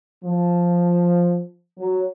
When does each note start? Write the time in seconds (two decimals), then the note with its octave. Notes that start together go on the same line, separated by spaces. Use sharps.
0.24 F3
1.79 F#3